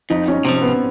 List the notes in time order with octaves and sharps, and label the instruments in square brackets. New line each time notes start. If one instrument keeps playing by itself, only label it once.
[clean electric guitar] F2 [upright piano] D#4
[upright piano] C#4
[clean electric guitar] C3 F3 [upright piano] C4
[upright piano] B3